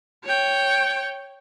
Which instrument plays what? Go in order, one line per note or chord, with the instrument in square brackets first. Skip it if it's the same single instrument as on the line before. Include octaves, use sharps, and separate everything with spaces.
[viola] C#5 G5